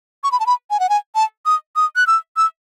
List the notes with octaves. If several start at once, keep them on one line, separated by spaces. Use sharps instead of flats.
C#6
B5
A5
B5
G#5
F#5
G#5
A5
D#6
D#6
F#6
E6
E6